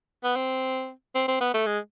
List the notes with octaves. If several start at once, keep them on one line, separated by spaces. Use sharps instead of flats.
B3
C4
C4
C4
B3
A3
G#3